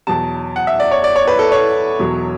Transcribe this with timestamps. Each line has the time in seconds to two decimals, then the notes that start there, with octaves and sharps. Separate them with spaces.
0.07 E2 B2 F#3 A5
0.56 F#5
0.67 E5
0.80 D5
0.91 C#5
1.04 D5
1.16 C#5
1.28 B4
1.39 A4
1.52 C#5
1.99 E1 E2 B2 F#3